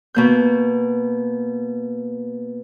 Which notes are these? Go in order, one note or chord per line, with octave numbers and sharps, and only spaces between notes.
B2 A#3 G6